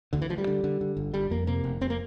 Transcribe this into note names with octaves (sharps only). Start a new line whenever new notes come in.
D2 D3
E3
D2 F3
G3
D3
D3
D3
G1
G1 G3
F2 A#3
C3 A#3
F1
F1 C4
A#3